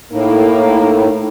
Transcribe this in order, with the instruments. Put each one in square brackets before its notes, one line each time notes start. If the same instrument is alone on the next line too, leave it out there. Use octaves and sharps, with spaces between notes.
[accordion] A2 [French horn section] A#3 [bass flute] D#4